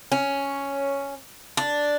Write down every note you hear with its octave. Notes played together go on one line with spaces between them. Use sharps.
C#4
D4